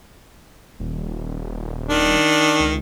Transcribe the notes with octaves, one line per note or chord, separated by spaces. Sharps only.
D#1
D#3 D4
C#2